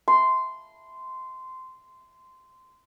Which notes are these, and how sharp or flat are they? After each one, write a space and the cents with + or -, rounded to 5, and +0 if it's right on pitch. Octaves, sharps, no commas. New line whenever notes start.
C6 -15